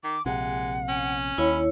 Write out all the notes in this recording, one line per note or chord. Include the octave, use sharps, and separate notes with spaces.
D#3 D6
A#1 C3 G#3 F#5
C#4
D#2 E4 C#5 B5